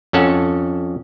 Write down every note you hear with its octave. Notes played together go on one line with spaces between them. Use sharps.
F2 C#4 A4 F#5